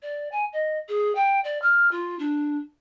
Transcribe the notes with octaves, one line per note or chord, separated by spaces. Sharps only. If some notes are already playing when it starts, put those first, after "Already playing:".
D5
G#5
D#5
G#4
G5
D5
F6
F4
D4